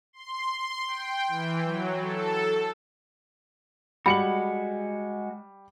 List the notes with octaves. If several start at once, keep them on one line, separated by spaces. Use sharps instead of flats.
C6
C6
G5
E3
F#3
A4
G3 G#3 F#4 B5 C#7 F#7